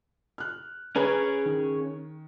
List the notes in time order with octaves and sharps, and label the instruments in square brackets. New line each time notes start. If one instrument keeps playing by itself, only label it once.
[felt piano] F6 F#6
[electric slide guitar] C#4 G#4 [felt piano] B4 C#5 A#5
[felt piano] D#3